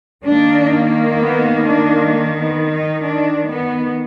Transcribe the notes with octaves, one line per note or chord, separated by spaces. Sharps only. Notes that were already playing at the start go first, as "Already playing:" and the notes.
D#3 A#3 D4
B3
D4
A#3
B3
D#4
D4
B3